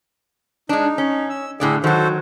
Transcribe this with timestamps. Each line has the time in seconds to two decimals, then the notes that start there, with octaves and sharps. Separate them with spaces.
0.69 G#3 D4 D#4
0.98 C#4
1.30 E6
1.60 A2 D3 G#4 D5
1.84 D#3 F#3 F#4 A4 C5